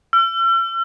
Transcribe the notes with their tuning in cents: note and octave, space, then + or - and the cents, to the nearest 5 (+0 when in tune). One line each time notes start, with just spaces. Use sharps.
E6 +45